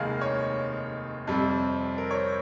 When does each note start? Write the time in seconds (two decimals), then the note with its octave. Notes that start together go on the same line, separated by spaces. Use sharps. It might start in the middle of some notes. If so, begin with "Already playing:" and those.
Already playing: F1 D#2 D#3 G#3 F5
0.21 C#5
1.27 F2 C3 G3
1.98 A#4
2.11 C#5
2.16 C5